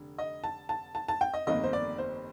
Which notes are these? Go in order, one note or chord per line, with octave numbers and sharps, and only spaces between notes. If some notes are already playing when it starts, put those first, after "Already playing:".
Already playing: F1 D3
D#5
A5
A5
A5
A5
G5
D#5
G1 F2 D#3 A#3 D#5
C5
D5
C5